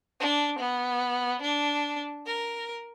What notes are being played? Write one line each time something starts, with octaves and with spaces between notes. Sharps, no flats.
D4
B3
D4
A#4